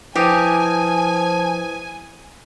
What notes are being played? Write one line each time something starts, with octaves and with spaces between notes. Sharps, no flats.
F3 E4 G4 B4 G#5 D#6